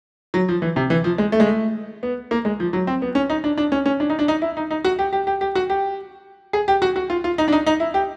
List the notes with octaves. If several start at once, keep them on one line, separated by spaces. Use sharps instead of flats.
F#3
F3
E3
C3
E3
F3
G#3
A3
G#3
A3
B3
A#3
G#3
F3
F#3
C4
B3
C#4
D#4
D4
D4
C#4
C#4
D4
D#4
D4
D#4
E4
D#4
D#4
F#4
G4
G4
G4
G4
F#4
G4
G#4
G4
F#4
F#4
F4
F4
D#4
D4
D#4
D#4
E4
G4